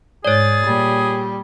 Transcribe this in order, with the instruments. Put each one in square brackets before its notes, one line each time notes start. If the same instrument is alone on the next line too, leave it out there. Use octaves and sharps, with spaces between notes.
[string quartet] G#2 A6 [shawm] G#4 [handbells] C#5 D5
[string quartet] A#2 [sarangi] G3